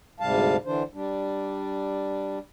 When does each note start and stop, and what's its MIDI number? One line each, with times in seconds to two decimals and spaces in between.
0.20 0.57 38
0.20 0.57 44
0.20 0.57 48
0.20 0.57 55
0.20 0.57 77
0.20 0.57 81
0.65 0.83 50
0.65 0.83 52
0.65 0.83 62
0.65 0.83 72
0.94 2.39 55
0.94 2.39 62